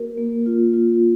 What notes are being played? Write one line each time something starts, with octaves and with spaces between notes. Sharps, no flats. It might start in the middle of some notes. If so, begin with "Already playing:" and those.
Already playing: A#3 F#4 A#4
A#3
F4
F4